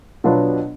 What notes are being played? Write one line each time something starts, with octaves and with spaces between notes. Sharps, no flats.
B2 F#3 B3 D4 F4